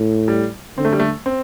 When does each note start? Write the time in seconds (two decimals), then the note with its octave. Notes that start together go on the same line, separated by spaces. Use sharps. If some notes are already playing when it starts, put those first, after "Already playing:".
Already playing: A2
0.28 G3
0.77 D3 C4
0.85 A3
0.93 G3
1.00 A3
1.26 C4